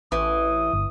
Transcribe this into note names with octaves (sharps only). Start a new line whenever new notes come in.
A1 E3 D#6
G1